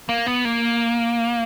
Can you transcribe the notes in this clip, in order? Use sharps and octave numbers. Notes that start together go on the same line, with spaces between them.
A#3
B3
A#3